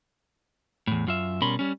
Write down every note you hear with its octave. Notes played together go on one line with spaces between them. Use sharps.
E2 A2
F#2 F4 E5
B2 G3 C#4 A#4 B5 C6
G3 C#4